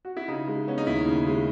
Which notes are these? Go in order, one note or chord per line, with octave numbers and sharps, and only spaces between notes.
F#4
E4
C#3 D#4
G#3
B3 C#4
D#4
D#2 E4
C#3
G#3